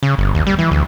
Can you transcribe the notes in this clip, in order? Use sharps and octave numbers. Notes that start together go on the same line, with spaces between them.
C#3
G1
D#2
G3
E3
D2